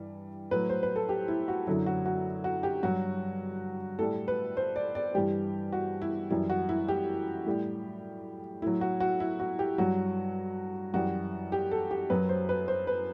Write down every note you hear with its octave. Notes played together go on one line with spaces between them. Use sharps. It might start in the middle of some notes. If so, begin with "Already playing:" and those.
Already playing: G2 E3 G3
A2 F#3 B4
C5
B4
A4
G4
E4
F#4
F#2 D3 F#3 E4
F#4
F#4
F#4
G4
G2 F#3 F#4
A2 G3 A4
B4
C5
D5
D5
G2 E3 G3 G4
F#4
E4
F#2 E3 G3 E4
F#4
E4
G4
A2 G3
A2 F#3 E4
F#4
F#4
E4
F#4
G4
G2 F#3 F#4
F#2 E3 G3 F#4
G4
A4
G4
F#2 F#3 B4
C5
B4
C5
B4